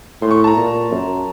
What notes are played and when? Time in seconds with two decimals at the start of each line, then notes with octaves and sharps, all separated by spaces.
0.21 A2 C6
0.31 C#6
0.44 A5
0.47 A#5
0.57 A#2
0.91 F#2